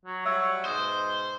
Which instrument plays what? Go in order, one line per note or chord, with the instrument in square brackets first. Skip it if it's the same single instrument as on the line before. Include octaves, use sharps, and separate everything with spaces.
[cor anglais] F#3
[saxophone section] F#3 G3 [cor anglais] C#5 [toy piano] E5 E6
[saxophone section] G#2 B2 [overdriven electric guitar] C5 [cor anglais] D#5